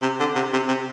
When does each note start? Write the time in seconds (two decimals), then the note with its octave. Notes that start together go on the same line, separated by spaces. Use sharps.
0.02 C3
0.19 D3
0.35 C3
0.53 C3
0.68 C3